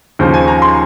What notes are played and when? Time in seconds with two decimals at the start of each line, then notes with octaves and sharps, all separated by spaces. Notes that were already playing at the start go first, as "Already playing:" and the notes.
0.19 D#2 C#3 F3 C5
0.34 G#5
0.48 A#5
0.62 C6